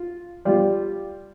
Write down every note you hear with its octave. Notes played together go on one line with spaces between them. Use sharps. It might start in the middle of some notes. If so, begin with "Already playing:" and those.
Already playing: F4
G3 F4 D5